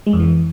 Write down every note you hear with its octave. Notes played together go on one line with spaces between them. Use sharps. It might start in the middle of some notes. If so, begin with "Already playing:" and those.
G#3
F2
E3